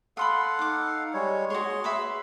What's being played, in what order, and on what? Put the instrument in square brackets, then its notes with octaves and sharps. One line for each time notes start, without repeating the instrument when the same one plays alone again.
[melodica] A4 F5 F#5 [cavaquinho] B5 C6 D#6
[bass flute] D#4 [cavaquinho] D6 D#6
[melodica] G3 G#3 C#5
[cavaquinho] F#4 C#5 [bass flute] G#4 [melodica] C6
[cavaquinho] B4 E5 B5